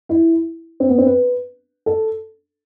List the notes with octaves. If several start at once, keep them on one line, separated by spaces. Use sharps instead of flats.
E4
C4
B3
C4
B4
A4